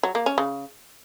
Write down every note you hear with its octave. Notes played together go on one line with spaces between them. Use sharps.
F#3
A#3
C#4
C#3